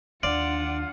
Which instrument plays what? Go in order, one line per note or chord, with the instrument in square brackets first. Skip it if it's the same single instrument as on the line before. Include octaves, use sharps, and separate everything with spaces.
[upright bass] D#2 [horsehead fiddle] D4 F#5 [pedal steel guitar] F4 [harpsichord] D5